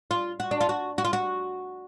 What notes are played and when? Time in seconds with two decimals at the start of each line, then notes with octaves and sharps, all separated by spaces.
0.11 F4
0.40 F#4
0.51 D4
0.61 F4
0.69 F#4
0.98 F#4
1.05 F4
1.13 F#4